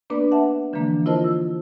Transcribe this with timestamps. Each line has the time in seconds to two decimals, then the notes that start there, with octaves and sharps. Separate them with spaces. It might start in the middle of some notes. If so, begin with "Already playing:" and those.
0.10 A#3 B3 D4 B4 D5
0.31 E5 F#5 A5
0.73 D3 E3 F3 G#3 A#3 D4
1.06 E4 F4 A#4 C5 D#5 A5
1.24 E6